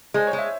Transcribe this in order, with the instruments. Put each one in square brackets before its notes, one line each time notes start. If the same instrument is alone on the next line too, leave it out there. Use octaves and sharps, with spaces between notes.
[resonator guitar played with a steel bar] G#3 [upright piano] C5
[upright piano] C#5
[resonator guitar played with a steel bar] G#3
[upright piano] E5